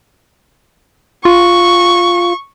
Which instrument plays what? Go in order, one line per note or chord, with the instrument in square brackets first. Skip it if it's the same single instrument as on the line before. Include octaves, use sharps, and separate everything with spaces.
[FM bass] F4 [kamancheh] C#6